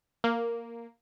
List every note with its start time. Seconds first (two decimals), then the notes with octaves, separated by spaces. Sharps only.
0.24 A#3